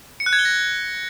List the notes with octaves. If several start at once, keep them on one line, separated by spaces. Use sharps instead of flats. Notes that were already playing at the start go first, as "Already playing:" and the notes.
C#7
F#6
G#6
G7
A#6